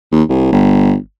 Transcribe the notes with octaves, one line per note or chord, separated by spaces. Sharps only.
D#2
C2
G1